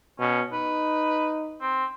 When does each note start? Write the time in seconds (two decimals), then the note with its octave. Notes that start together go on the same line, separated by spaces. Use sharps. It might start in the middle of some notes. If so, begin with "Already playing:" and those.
0.19 B2 C#4
0.52 D#4 B4
1.61 C4